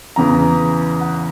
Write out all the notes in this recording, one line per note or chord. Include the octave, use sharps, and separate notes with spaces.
E2 C#3 E3 A#5
F#5